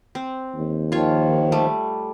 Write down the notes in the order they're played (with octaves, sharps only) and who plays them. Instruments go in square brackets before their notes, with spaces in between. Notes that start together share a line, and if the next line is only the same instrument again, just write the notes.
[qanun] C4
[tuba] D#2
[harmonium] D#3 F3 [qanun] F4 C#5
[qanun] G3 A3